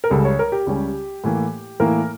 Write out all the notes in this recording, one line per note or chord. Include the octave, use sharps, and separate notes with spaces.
A#4
C#2 C#3 G3 C#4 A4
C#5
A#4
G4
C#2 C#3 G3 C#4
A2 E3 A#3
A2 E3 A#3 A#4